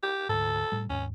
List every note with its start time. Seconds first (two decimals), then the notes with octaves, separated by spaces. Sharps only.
0.03 G4
0.29 D2 G#2 A4
0.72 A2 G3
0.89 D#2 G#2 C#4